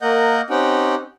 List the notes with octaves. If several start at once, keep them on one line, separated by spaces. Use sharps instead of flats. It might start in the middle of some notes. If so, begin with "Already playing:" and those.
A#3 A#4 D#5 F#5 G6
C4 C#4 D#4 G4 F#5 G5